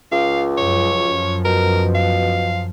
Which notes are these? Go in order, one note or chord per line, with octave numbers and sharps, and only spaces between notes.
C#2 F5
F#2 F3 C#5
B2 A#4
F5